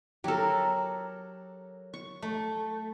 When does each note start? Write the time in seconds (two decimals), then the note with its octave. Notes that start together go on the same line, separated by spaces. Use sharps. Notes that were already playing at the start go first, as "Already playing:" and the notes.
0.24 F#3 G4 A4 A#4
1.94 C#6
2.22 A3